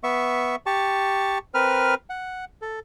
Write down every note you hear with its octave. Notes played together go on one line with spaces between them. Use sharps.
B3 E5 C#6
G4 A5 C#6
C4 A#4 B4 F6
F#5
A4